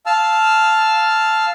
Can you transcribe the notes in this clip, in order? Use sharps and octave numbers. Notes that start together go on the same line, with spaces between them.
F5 A5 E6 F6